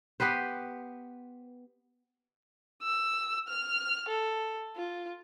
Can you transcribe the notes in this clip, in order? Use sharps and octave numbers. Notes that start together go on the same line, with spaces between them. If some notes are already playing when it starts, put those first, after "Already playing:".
B3 G4 B4 C5
E6
F6
A4
F4